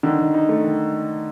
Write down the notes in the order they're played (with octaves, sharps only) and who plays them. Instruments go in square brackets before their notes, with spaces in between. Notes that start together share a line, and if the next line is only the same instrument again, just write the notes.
[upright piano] D3 [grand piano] D#3
[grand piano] D#3
D#4
A3
D#3